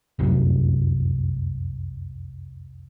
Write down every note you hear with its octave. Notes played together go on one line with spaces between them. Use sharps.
F1 C2 F#2